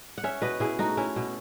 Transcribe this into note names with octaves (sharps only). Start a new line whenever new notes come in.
F#5
C#4 C#5 E5
B2 B4 D#5
B2 E4 G#4
A3 D#4 F#4
C#4 E4
B2